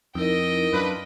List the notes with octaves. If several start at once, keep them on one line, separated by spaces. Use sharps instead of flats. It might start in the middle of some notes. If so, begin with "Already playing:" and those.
F2 D#4 E4 A#4 D#5 G5
F#2 D4 F4 B4